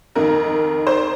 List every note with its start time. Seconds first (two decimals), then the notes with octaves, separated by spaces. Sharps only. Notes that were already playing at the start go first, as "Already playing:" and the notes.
0.15 F2 D#3 A#4
0.87 C5